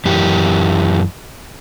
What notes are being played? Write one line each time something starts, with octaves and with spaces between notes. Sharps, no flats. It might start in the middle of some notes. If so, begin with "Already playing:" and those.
F#2 E3 G4